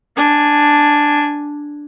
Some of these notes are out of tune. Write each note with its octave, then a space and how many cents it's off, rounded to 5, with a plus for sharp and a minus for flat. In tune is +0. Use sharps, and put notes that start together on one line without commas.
D4 +0 G#5 +0